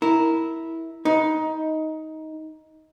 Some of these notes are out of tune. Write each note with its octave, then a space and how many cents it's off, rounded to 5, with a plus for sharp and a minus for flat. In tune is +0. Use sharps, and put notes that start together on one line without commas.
E4 -10 A#4 +0
D#4 +15 B4 +0